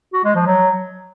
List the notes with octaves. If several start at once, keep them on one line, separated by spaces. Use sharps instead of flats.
F#4
G#3
F3
F#3